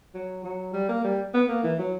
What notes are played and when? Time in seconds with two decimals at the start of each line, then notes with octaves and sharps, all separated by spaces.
0.15 F#3
0.44 F#3
0.73 G3
0.89 A#3
1.04 G3
1.34 B3
1.49 A#3
1.64 E3
1.79 F#3